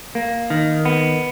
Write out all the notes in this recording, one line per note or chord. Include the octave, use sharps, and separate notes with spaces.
A#3
D#3
B3